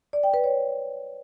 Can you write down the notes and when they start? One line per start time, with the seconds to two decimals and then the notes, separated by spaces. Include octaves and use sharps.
0.13 D5
0.23 G5
0.34 B4
0.44 C#5